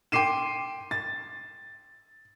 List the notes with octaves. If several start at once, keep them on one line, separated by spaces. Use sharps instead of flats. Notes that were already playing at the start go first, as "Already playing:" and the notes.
G5 C6 D6 C7 D#7 E7
A6